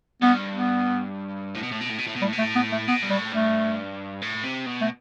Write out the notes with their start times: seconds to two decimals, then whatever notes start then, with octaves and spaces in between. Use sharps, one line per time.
0.22 G2 B3
0.55 B3
1.55 A2
1.63 B2
1.72 A2
1.81 B2
1.90 A2
1.99 B2
2.07 A2
2.16 B2
2.22 G3
2.24 A2
2.33 B2
2.38 A3
2.42 A2
2.56 B3
2.72 A3
2.88 B2 B3
3.03 G2
3.10 A2 G3
3.32 G2 A3
4.22 A2
4.43 C3
4.66 B2
4.81 A3